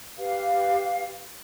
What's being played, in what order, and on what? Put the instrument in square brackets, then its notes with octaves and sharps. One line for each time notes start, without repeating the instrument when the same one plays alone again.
[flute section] G4 B4 F5